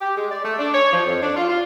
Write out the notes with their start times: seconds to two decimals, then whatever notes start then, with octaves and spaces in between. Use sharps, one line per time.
0.02 G4
0.17 G#3
0.31 D5
0.45 A3
0.59 D4
0.74 C#5
0.93 F3
1.06 F2
1.23 D4
1.37 F4
1.49 F4